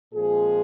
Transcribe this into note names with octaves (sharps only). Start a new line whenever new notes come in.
A#2 F3 G#3 C4 G#4